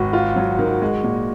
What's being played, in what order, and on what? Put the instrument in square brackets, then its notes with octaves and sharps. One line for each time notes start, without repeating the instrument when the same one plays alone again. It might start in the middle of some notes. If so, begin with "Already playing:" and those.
Already playing: [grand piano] G#1 [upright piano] F#4
[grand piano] F4
F#3
D#3
G#3
A#2